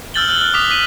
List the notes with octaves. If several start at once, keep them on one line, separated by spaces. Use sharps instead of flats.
E6 F6 G6 A6 F#7 G7
E6 F#6 F#7 G7
F6
D6 D#6 B6 F7
B6 D#7 F#7